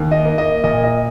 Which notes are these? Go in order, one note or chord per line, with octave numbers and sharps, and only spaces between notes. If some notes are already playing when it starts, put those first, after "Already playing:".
Already playing: D#2
D#5
A#3
D#5
A#2 D#5
D#5